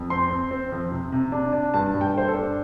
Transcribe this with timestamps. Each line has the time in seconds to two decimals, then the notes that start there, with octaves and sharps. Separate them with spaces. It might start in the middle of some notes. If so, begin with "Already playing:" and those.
Already playing: F2
0.10 C4 C6
0.30 C4
0.51 C4
0.72 F2
0.92 C3
1.12 C3
1.32 D4
1.53 D4
1.74 G2 A5
1.94 G2
2.01 G5
2.14 G2 C5
2.28 A4
2.35 D4